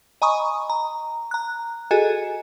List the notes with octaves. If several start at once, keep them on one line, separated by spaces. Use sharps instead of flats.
D#5 G#5 A#5 B5 C#6 D#6
A#5
A#5 F#6
F#4 G#4 A4 D#5 G#5